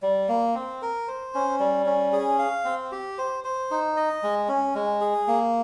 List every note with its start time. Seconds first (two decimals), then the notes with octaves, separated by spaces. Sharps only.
0.02 G3
0.29 A#3
0.55 C4
0.82 A#4
1.08 C5
1.35 C#4
1.60 G3
1.86 C#4
2.13 G#4
2.39 F5
2.65 C4
2.92 G4
3.18 C5
3.44 C5
3.71 D#4
3.97 D#5
4.23 G#3
4.48 C#4
4.75 G#3
5.01 G#4
5.27 A#3